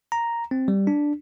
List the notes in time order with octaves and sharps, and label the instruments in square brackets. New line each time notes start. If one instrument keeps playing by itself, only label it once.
[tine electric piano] A#5
C4
G3
D4